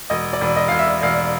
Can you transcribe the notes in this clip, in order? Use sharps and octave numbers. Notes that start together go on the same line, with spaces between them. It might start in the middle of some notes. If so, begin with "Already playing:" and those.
E1 D#5
D5
E1
D#5
E1 F5
E5
E1 F5